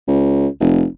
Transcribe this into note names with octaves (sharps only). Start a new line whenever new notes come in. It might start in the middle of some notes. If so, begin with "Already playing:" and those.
C#2
F1